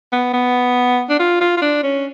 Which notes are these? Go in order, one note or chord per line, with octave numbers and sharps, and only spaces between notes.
B3
B3
D4
F4
F4
F4
D4
C#4